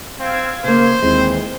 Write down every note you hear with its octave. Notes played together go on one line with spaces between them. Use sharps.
C4 F5 E6 G#6
C#3 A#3 C5
D#2 E3 G#3 C4